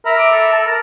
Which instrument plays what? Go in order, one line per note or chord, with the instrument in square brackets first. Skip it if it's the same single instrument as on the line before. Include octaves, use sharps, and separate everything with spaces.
[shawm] A#4 [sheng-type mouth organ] E5 A#5 B5
[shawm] D6
A4
A5
A#4